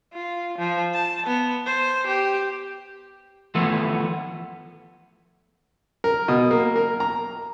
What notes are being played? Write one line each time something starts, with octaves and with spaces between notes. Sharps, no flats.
F4
F3
A5
B3
C5
G4
E3 F3 A3 B3
A#4
B2
A#3
A#4
A#5